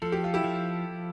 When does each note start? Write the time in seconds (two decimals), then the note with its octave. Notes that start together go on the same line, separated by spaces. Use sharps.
0.02 F3 A4
0.12 G4
0.24 F4
0.34 E4 G4
0.44 F3